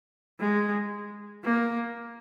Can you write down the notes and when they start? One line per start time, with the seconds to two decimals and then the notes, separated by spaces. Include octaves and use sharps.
0.40 G#3
1.43 A#3